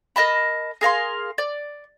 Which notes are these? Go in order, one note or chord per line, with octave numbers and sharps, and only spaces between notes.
A#4 D#5 A5 B5
G#4 A#4 F5 C6
D5